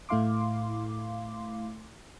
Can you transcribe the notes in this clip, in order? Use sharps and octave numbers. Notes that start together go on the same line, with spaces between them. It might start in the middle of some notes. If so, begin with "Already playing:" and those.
A2 A3 E4 F5 C6 D6